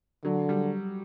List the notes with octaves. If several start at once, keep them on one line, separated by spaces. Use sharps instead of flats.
D3 F#3
G3